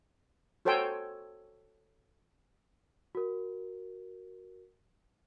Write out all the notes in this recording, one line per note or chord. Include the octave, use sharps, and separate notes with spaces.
F#4 A4 C5 C#5 G5 G#5
F#4 A#4